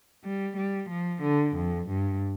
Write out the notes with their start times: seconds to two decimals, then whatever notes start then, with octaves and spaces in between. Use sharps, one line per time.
0.25 G3
0.57 G3
0.90 F3
1.22 D3
1.56 F2
1.89 G2